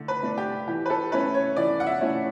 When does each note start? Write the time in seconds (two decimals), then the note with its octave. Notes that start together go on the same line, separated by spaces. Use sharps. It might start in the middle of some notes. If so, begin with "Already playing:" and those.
Already playing: D3 A3
0.08 B4
0.23 A3 D4
0.38 G4
0.68 E3 G4
0.86 B4
0.90 A4
1.12 A3 C#4 E4 B4
1.34 C#5
1.56 E3 D5
1.80 F#5
1.86 E5
2.01 A3 C#4 E4